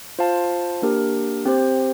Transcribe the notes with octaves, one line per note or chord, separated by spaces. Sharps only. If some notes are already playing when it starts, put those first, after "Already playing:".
F4 C5 F5 A5
A#3 D4 G4 A#4
C4 G4 C5